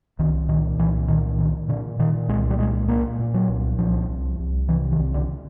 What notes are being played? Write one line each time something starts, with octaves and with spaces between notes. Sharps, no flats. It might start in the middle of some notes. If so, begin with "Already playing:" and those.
C2 D#3
A#2 D#3
C2 E3
A#2 D#3
A#2 D#3
A#2 D3
A#2 D#3
C2 G#3
G3
A#2 G#3
A#2 A#3
A#2
F#3
C2
C2 F3
C2
C2
C3 E3
D#3
C2
D3